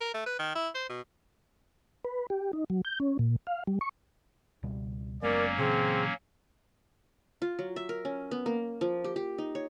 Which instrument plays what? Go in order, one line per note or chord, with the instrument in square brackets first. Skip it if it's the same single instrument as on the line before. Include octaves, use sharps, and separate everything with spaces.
[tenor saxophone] A#4
A3
B4
D#3
E4
C5
B2
[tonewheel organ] B4
G4
D#4
F#3
G6
C#4
A#2
F5
G3
C#6
[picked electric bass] C#2 B2 G3
[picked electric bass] F#1 G#3 B3 [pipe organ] F#3 A#3 C#4 [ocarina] A#4 [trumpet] D5
[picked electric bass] A#2 C#3 E3 [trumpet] C4 [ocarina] G#4
[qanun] F4
F#3
E5
A#4
C#4
B3
A#3
F3
G4
G4
D#4
C#5